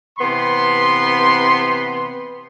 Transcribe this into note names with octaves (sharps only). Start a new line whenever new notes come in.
C3 E3 B3 B5 C6